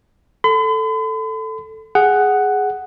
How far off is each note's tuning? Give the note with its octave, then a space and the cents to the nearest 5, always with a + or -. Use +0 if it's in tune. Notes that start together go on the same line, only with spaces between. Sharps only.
A4 +0 B5 +45
G#4 +0 F#5 +5